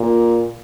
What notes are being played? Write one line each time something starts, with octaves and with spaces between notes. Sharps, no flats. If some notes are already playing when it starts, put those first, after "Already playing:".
Already playing: A#2